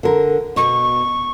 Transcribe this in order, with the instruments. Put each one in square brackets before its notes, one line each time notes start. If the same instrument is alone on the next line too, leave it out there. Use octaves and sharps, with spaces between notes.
[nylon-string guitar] D3 A#4
[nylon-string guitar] B2 [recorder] C#6